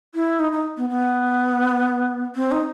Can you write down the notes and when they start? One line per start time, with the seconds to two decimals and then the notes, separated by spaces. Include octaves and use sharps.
0.15 E4
0.40 D#4
0.52 D#4
0.77 B3
0.89 B3
2.36 C4
2.52 D#4